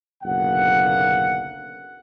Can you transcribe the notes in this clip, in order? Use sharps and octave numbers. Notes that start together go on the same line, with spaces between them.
F#1 B1 D3 A#3 F#5